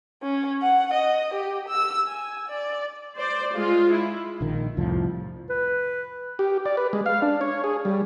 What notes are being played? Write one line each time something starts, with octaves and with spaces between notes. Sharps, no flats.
C#4
F#5
D#5
G4
E6
G#5
D5
C5 D5
G#3 F4
E4
A#1 D#3
C2 F2 A2 F3
B4
G4
D5
B4
G#3
F5
D4
C#5
G#4
G3